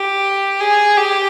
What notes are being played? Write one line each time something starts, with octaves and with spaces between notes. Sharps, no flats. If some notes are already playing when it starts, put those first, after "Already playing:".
Already playing: G4
G#4
G4